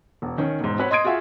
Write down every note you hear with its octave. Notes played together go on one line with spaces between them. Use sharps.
E1
D#3 C#4
E1 G#2
C4 F#4 B4 C#5
D#5 C6 D#6 G#6 D7
F4 F#4 G#4 E5 F5